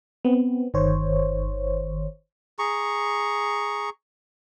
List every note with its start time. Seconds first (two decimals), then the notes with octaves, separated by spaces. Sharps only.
0.25 B3 C4
0.74 G1 D#3 C5 C#5
2.59 G#4 A#5 C#6